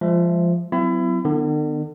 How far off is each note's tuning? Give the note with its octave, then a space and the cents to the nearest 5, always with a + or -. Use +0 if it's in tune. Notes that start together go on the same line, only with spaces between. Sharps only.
F3 -10 G#3 -25 E5 +10
F#3 +0 C4 -35 E4 +30
D3 +45 B3 +0